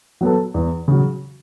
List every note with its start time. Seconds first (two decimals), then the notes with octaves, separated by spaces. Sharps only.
0.21 F#3 B3 A4
0.54 E2
0.88 C#3 F#3